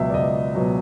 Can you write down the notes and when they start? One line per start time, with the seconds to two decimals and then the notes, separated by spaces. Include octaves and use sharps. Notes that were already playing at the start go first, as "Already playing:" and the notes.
Already playing: C#2 B2 F#3 E5
0.10 D5
0.14 C#2 D#5
0.55 B2 F#3